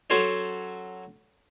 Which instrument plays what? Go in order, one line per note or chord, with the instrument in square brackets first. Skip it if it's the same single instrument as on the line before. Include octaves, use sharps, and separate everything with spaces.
[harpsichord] F#3 C#4 A4 C5 C#5